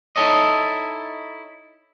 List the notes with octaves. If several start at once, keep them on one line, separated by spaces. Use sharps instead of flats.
D#4 E4 G4 A4 C#5 D#5